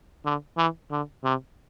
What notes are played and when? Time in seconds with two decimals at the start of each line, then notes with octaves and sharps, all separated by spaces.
0.25 D3
0.57 E3
0.91 D3
1.24 C3